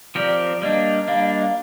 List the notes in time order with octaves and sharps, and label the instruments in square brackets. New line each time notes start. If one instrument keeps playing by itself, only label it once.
[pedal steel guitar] F3 C4 G4 A#4 [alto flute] D5
[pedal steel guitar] G3 A#3 D4 [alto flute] D#5
[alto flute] D#5
[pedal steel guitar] G3 A#3 D4 [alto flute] F5
[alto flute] D#5
D#5
F5